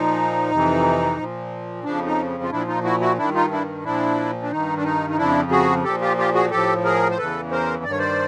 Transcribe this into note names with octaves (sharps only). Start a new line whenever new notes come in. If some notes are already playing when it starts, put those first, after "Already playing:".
Already playing: A#2 F3 D#4
F2 C3 E3
A#2 F3
F2 C#3 F3 D4
D#4
F4
A#2 F3 D4 E4
D#4 F4
E4 F#4
E4 F#4
G2 D#3 D4 E4
D#4 F4
D4 E4
A#2 F3 D4 E4
D4
G2 D#3 D#4
D4
D#4
D#4
F2 C#3 F3 D4 E4
F#4 G#4
A#2 F3 G4 A4
F4 G4
F4 G4
F#4 G#4
A2 F3 G4 A4
G#4 A#4
C5
E2 C#3 E3 A4 B4
A#4 C5
G2 D#3 C#5 D5
C5 D5